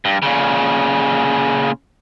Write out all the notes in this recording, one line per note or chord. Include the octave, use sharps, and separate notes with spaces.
G2
A#2 C#3